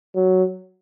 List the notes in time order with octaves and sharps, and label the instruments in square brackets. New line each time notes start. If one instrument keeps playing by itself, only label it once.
[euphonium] F#3